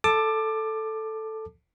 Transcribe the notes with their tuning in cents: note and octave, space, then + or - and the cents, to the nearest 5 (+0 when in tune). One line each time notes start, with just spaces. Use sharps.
A4 +0 A5 +0 D6 +20